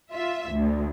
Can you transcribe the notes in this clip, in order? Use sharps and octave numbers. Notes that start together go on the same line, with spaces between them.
F4 E5
D2